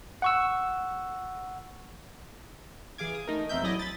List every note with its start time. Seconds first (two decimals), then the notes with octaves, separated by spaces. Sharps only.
0.22 F#5 C#6 E6
2.98 E3 G#4 F5 D6 G#6
3.15 D#6
3.27 A3 D#4 A#4
3.49 E2 C4 A#4 E5 G6
3.62 A1 F#3 E4 D5 D#5 G#5
3.79 B5 A6